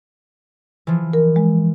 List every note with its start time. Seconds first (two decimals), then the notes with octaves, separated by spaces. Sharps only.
0.87 E3 F3
1.13 A#4
1.36 G#3